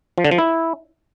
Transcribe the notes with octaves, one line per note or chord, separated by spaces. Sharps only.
F3
D3
F3
E4